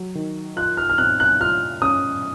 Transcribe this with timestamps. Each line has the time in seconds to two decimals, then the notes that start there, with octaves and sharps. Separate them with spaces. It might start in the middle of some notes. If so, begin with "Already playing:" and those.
Already playing: F#3
0.15 D#3
0.57 F4 F#6
0.77 F6
0.90 F6
0.98 C4 F#6
1.20 F#6
1.40 F4 F6
1.82 C#4 D#6